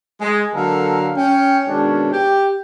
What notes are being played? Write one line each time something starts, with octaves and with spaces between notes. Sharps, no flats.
G#3
D3 F#3 A#3 A4 A#4 F5
C#4 G5
B2 D#3 G#3 C#4 D4
G4 G5